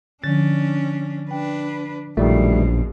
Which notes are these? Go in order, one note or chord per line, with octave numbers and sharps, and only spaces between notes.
D3 F3 C#4 D4 A6
D4 B4 G5
A#1 F#2 B2 D#3 G3 A3